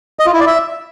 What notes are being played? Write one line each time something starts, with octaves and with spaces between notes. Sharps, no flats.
D#5
F4
E4
D5
E5